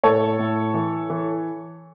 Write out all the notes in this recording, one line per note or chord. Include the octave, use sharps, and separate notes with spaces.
A2 A4 C#5
A2
E3
E3